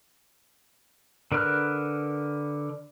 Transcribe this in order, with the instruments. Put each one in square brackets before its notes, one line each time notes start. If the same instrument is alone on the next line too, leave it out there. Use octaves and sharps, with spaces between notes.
[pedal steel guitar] D3 A#4 B4 F6 F#6